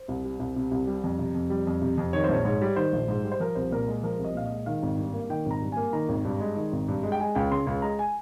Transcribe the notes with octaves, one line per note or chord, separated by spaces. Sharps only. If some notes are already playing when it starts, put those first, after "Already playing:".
Already playing: C5
C2
G3
C2
C3
C2
G3
F2
C3
F2
G3
F2
C3
F2
D#3 C#5
C5
A#1 C#5
G#2 C#5
G3
D#3 C5
A#1
G#2
G3
C5
F3 A#4
C2 C5
A#2 A#4
G#3 G#4
F3 A#4
C2
D#5
A#2 F5
D#5
G#3
D#3 F5
G#1
G2
A#3
D#3 G5
G#1 A#5
G2
A#3 G#5
D#3 A#5
G#1
G2
G#3
D#3
G#1
G2
G#3
G5
G#3 G#5
C#2 G5
C#3 C6
C#2
G#3 A#5
G#5